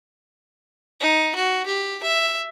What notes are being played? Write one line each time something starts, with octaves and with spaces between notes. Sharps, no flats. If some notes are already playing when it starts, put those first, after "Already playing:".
D#4
F#4
G4
E5